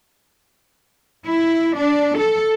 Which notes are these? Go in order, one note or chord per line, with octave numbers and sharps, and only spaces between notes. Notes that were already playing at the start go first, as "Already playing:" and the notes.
E4
D4
A4